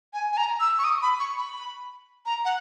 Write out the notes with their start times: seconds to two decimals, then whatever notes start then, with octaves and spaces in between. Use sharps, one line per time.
0.13 G#5
0.32 G#5
0.37 A#5
0.60 E6
0.79 C#6
0.84 D#6
1.02 B5
1.19 C#6
1.37 B5
2.26 A#5
2.45 F#5